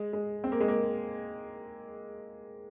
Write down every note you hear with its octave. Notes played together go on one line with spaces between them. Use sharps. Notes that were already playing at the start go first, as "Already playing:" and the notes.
Already playing: G#3
G#3
C4
A#3
G#3
A#3